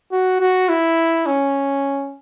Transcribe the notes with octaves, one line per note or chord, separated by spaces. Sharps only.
F#4
F#4
E4
C#4